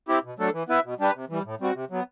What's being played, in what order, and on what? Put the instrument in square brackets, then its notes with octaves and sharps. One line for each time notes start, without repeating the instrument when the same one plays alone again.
[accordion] C4 E4 G4
B2
F#3 A3 D4 A4
E3
B3 E4 B4 E5
B2
G3 D4 G4 B4
C3
E3 G3
A2
G3 C4 F#4
C3
F#3 B3